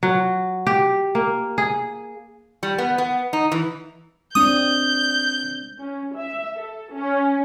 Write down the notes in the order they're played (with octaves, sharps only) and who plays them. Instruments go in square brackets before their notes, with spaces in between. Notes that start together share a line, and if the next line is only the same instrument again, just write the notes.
[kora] F#3
G4
A#3
G#4
[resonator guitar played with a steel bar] G3
B3
B3
D#4
E3
[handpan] G#3 C4 D4 [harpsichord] D#6 [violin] G6
[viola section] C#4
E5
A4
C#4